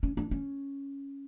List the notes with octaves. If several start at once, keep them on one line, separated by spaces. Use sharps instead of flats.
C#4
D4
C#4